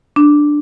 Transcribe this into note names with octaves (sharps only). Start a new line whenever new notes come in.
D4